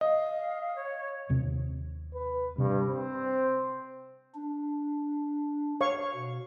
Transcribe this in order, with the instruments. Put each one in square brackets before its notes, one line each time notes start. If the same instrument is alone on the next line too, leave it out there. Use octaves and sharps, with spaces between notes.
[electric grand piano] D#5 [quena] F5
[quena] C#5
[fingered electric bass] D#2 C3 C4
[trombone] B4
[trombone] G2 [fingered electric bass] C3
[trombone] C4
[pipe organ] D4
[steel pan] C#5 F5 C#6
[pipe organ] B2